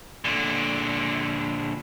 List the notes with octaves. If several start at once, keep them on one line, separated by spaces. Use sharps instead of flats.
A#2 D3